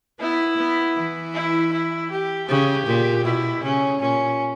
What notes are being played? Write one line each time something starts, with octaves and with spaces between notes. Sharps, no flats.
B3 E4
B3
E3
E4
E4
G4
C#3 G4
A#2
B2 E4
C#3 C#4
A#2 C#4